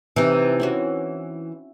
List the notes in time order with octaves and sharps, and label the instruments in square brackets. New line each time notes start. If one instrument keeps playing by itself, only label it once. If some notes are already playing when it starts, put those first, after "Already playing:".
[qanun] C3 D#4 D6 [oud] E3
[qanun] C4 C#4 F#4